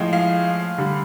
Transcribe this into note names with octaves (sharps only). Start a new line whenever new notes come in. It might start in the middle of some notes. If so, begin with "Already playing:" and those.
Already playing: A2 F3 G#3
F5
D3 G3